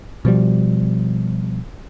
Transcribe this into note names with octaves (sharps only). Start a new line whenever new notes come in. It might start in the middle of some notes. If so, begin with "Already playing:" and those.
B2 F3 G3